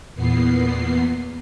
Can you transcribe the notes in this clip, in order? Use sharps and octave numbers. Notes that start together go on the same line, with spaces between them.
E2 A#2 B3 C7